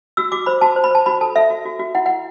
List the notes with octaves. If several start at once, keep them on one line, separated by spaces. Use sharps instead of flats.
F#4 E6
F#4 D6
C5 B5
F#4 A5
C5
B5
C5 A5
F#4 B5
A4 A5
A4 E5
F#4
F#4
F#4
E4 F#5
E4 F#5